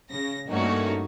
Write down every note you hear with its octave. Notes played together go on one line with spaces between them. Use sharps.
C#3 A#6
G2 A3 A#3 C#4 D#4 F#4